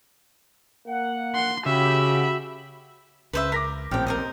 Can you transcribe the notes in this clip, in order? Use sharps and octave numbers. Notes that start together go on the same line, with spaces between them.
A#3 F#5
C6
C#3 F#4 G4 E5 B5
C#2 C#3 B4 C5 E5
A#4 D6 A#6 B6
D#1 A#1 A2 C4 G4 G5 F6
A#4 C5 D#5